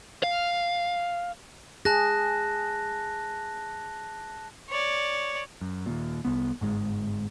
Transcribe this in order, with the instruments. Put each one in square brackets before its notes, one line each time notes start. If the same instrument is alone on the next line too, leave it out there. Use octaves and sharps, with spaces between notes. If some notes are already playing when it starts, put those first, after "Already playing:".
[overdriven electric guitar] F5
[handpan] G#4 [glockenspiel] A5 F#6 A#6
[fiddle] C#5 D5
[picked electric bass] F#2
D#2 A#2
C2 B3
G1 G#2 G#3